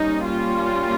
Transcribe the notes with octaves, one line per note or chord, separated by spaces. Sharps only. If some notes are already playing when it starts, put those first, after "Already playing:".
Already playing: G3 A#3 C#4 D#4
F4